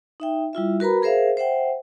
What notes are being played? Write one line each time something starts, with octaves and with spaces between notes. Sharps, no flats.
D#4 E5 G5
G3 E4 F4 E5
F#4 A#4 B4 A#5 B5
G#4 A#4 C5 E5 F5
C5 E5 F#5 G5